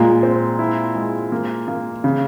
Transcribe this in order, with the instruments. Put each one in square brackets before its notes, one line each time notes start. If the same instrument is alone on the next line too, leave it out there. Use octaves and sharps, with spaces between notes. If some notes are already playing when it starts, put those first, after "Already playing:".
Already playing: [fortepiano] A#2 [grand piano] G#3
[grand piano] C4
E4
G#3
A#3
A#3
C#3